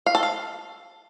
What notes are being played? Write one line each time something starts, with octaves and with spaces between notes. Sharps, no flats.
F5
A4
F5